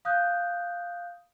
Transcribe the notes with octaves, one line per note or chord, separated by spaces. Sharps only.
F5 D#6 F#6 G6